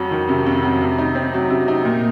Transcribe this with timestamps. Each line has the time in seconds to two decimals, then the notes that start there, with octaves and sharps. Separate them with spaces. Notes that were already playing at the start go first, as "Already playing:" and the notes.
Already playing: F2 F#3
0.11 D#3
0.29 C3
0.46 F2
0.63 F#3
0.81 C3
0.98 D#4
1.15 C4
1.33 F#3
1.50 C3
1.68 D#4
1.85 A#2